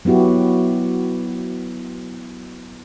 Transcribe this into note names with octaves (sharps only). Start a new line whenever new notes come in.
F#3 B3 E4 F#4 G4